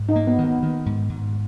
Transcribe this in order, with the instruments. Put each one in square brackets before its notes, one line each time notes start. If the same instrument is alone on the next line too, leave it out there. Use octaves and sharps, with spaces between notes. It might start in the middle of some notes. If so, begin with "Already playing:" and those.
Already playing: [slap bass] G#2
[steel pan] D#4
[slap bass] A#3
[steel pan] B3
[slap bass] D#3
[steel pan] B3
[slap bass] D#3
G#2
G#2